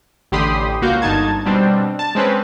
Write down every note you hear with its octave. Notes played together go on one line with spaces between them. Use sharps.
A1 D3 G4 B5 C6 D#6
C#2 A#3 F#4 F5 G6
G1 D#4 A5 G#6
B2 G3 C4 D4
A5
G#3 C4 C#4 B4